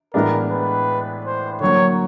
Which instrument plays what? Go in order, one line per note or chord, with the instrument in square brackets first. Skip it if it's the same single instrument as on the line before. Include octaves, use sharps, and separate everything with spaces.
[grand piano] A2 E3 G#3 B3 D4 [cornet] A#4
[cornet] B4
C5
[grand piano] D3 F#3 A#3 [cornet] C#5